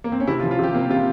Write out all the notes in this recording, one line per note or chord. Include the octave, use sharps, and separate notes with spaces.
A#3
C4
C#4
C3 E4
F4
F3
F4
C3 G4
A#3 C4
C3 F4